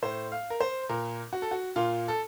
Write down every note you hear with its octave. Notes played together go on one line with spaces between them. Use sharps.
A2 C5
F5
A#4
C5
A#2 A#4
F#4
A4
F#4
A#2 F4
A4